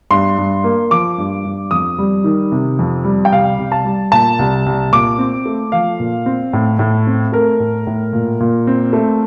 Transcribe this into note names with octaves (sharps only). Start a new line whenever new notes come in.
G2 C6
G2
A#3
F3 D6
G2
G2
F2 D#6
G3
D#3
C3
F2
G3
G5
C2 F5
C2
A5
G3
A#2 A5
C2
C2
A#2 D6
C4
A3
F3 F5
A#2
C4
A2
A2
C4
A3 A#4
A2
A2
A#2
A#2
C4
A3